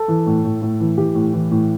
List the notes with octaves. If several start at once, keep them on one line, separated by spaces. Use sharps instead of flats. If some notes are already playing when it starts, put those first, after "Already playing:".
Already playing: A4
E3
A2
A2
A2
E3
E3 G4
A2
E3
A2